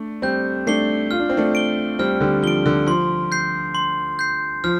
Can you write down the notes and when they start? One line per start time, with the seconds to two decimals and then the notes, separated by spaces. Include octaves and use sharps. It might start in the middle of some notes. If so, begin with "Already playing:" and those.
Already playing: A3 D4
0.22 G3 C4 G6
0.67 A3 D4 C7 G7
1.11 F4 F6
1.20 D4
1.29 C4
1.37 A3 D4
1.55 D7 G7
1.99 G3 C4 F6
2.20 D3 G3
2.42 F3 D7 G7
2.66 D3
2.86 F3 C6
3.32 G6 C7
3.75 C6
4.19 G6 C7
4.64 F3 F6